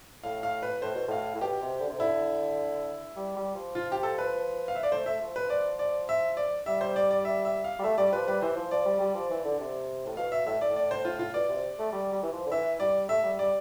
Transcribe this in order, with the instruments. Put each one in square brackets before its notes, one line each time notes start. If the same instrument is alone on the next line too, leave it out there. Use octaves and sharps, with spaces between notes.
[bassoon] A2 [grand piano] F5
[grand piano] F5
B4
[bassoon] A2 [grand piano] C5
[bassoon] B2
[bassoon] A2 [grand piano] F5
[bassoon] A2
[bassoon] B2 [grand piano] G4
[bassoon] C3
D3
C3
[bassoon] D3 [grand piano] E4
[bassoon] G3
G3
F3
[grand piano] F4
G4
A4
B4
F5
E5
D5
[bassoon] A3 [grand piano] C5
[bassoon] A3 [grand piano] E5
[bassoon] F3
[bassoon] F3 [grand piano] B4
[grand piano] D5
D5
E5
D5
[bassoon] G3 [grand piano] E5
[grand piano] C5
D5
D5
E5
E5
F5
[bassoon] G3
[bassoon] A3 [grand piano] E5
[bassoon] G3 [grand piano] D5
[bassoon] F3 [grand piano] B4
[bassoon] G3 [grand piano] B4
[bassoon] E3 [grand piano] C5
[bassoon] F3
[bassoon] F3 [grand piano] D5
[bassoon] G3
G3
F3
E3
D3
C3
A2
[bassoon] B2 [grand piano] F5
[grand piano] E5
[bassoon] A2 [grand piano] E5
[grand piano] D5
[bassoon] A2
[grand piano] D5
C5
F4
F4
[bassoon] B2 [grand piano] D5
[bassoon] C3
A3
G3
G3
E3
F3
D3
[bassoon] E3 [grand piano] E5
[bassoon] G3 [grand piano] D5
[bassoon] A3 [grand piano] E5
[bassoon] G3
[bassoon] G3 [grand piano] D5